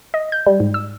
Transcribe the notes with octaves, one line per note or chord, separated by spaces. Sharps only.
D#5
G6
G3
G#2
E6